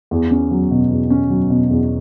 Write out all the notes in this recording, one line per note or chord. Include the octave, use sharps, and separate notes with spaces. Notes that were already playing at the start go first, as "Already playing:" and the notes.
E2
C#4
F#3
B2
E2
C#4
F#3
B2
E2